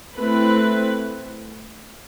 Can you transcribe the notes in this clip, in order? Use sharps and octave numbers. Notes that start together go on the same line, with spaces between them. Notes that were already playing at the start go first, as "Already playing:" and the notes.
A3 C4 E4 B4